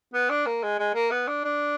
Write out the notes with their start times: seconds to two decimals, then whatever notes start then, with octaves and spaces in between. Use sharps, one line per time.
0.14 B3
0.30 D4
0.46 A#3
0.63 G#3
0.79 G#3
0.95 A#3
1.11 B3
1.28 D4
1.44 D4